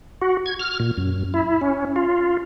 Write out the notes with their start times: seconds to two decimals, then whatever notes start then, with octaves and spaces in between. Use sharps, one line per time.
0.22 F#4
0.46 G#6
0.60 F6
0.80 A#2
0.97 F#2
1.34 E4
1.61 C#4
1.96 F4